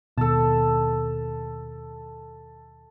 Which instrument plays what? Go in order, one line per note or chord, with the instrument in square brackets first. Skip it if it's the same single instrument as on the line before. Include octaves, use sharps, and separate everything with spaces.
[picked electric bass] D#2 B2 [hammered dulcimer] A4 A5